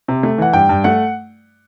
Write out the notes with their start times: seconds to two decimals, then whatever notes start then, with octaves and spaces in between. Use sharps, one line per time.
0.08 C3
0.23 A3
0.38 E3 F#5
0.53 G2 G5
0.69 G2
0.84 A3 F#5